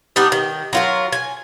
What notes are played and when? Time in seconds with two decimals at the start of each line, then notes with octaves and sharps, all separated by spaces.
0.16 G3 B3 D4 D#4
0.32 D#3
0.73 F#3 F4 A#4
1.12 G#5